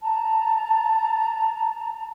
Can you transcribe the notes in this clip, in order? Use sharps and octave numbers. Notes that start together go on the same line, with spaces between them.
A5 A#5